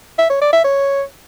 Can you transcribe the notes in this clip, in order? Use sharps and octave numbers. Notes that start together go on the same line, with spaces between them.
E5
C#5
D5
E5
C#5